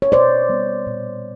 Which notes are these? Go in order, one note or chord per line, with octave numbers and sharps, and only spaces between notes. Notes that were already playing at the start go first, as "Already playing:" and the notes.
C#5
B2 C5 D5
G3 B3
A#2